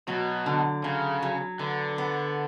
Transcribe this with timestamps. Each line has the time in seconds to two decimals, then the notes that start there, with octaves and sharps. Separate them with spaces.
0.07 B2 F#3
0.46 D3
0.84 C#3 F#3
1.22 F#3
1.59 D3 B3
1.98 B3